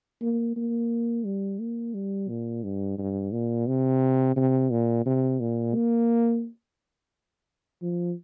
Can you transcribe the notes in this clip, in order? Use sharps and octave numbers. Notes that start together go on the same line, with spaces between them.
A#3
A#3
G3
A#3
G3
A#2
G2
G2
A#2
C3
C3
A#2
C3
A#2
A#3
F3